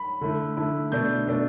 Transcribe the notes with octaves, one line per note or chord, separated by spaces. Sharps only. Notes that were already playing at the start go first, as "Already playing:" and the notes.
Already playing: B5
D3 A3 E4
D3 A3 E4
B2 A3 D4 G6
B2 A3 D4